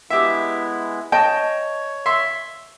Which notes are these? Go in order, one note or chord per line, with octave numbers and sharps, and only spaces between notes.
G#3 B3 E4 G4 E5
C#5 D#5 G5 A5
E5 C6